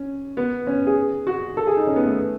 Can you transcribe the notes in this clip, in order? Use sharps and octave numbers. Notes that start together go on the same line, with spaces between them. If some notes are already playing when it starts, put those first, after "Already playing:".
Already playing: C#4
B3
C#4
G#4
F#4
A4
G#4
D#4
C#4
B3
A3